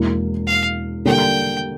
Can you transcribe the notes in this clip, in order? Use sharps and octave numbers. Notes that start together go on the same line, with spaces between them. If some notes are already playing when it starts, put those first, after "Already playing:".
Already playing: E1 E2 E3 A#3
F5
D3 G3 A#3 D4 G5